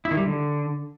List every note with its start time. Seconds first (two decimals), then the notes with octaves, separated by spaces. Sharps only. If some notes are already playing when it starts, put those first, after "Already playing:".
0.05 E4
0.11 D#3
0.17 G3
0.23 D3